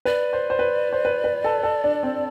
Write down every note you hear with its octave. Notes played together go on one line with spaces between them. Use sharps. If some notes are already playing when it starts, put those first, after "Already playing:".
B4 D5
C5
C5
B4
C5
B4
B4
A4
A4
D4
C4